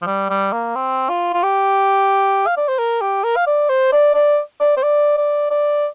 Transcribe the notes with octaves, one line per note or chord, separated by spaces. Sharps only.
F3
G3
G3
A#3
C4
F4
F4
G4
F5
D5
C5
A#4
G4
A#4
F5
D5
C5
D5
D5
D5
C5
D5
D5
D5